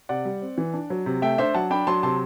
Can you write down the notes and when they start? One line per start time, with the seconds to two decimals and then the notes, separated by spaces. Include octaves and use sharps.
0.09 C3 D5 F#5
0.25 G3
0.42 C4
0.58 E3
0.74 D4
0.90 F#3
1.06 C3
1.22 A3 E5 G5
1.38 D4 C5 E5
1.54 F#3 F#5 A5
1.71 D4 G5 B5
1.87 F#3 A5 C6
2.03 C3 A5 C6